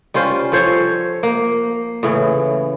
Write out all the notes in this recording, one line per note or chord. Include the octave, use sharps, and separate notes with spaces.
G3 C#4 F4 C5
F3 A4 C5 C#5
A#3
A2 C#3 E3